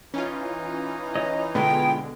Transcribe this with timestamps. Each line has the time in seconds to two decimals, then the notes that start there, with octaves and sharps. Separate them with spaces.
0.14 E3 C#4 D#4 F4
1.15 C#5 D#5 D#6
1.55 B2 D3 G#3 B3 F4 G#4 G5